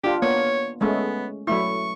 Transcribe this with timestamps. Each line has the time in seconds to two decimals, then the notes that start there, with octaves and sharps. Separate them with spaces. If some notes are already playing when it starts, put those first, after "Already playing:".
0.04 D4 F4 G4
0.22 A#3 B3 C#5
0.81 G#3 A3 B3 C#4
1.47 F#3 A3 E4 C#6